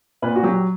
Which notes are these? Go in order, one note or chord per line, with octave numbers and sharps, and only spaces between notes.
A#2 B4
F#4
F#3 G4